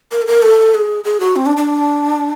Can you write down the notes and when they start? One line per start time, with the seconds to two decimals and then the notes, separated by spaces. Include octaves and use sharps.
0.12 A#4
0.22 A4
0.27 A#4
0.42 A4
0.74 G#4
1.04 G#4
1.20 F#4
1.36 C4
1.46 D4
1.57 D4